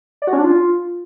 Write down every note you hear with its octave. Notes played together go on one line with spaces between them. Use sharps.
D5
F#4
C#4
D4
F4